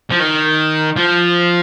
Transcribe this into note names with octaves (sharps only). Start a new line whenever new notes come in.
F3
D#3
F3